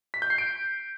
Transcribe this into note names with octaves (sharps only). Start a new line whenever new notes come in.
B6
G6
C7
D7